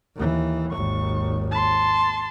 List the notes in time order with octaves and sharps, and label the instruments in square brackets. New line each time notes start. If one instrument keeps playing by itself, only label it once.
[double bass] D#2 E3
[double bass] G#1 D#2 [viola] C#6
[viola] A5 C6